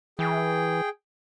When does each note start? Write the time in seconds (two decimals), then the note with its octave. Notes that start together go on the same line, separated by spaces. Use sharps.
0.19 E3 G#4 G5